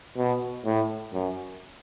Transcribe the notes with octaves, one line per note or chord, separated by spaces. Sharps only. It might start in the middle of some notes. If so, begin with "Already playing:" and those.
B2
A2
F#2